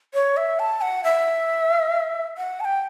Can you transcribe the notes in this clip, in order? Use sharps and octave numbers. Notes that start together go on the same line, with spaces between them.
C#5
E5
A5
F#5
E5
F#5
A5
G5